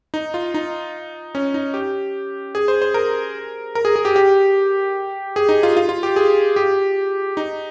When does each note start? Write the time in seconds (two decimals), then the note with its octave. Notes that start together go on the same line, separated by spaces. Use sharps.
0.14 D#4
0.34 F4
0.54 D#4
1.35 C#4
1.54 D#4
1.74 G4
2.55 G#4
2.68 C5
2.82 C5
2.94 A#4
3.75 A#4
3.85 G#4
3.96 G#4
4.05 G4
4.16 G4
5.36 G#4
5.49 D#4
5.63 F4
5.77 F4
5.89 F4
6.03 G4
6.16 G#4
6.56 G4
7.37 D#4